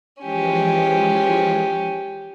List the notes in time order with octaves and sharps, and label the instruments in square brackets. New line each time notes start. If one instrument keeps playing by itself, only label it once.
[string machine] E3 F3 G#3 [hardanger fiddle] C#4 G4